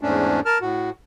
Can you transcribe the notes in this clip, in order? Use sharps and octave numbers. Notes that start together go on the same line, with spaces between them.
E2 G#2 A3 C#4 D4
A#4 A5 F6
A2 F#4